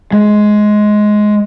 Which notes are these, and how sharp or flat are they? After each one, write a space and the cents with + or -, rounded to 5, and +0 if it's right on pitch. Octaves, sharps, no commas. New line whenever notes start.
G#3 +15